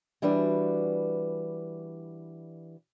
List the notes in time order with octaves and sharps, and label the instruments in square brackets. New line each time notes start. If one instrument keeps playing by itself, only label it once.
[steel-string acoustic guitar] E3 G3 D4 F#4 B4